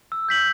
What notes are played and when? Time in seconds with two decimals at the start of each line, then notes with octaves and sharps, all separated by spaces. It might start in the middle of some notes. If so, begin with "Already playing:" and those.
0.12 E6
0.29 G6 B6 F#7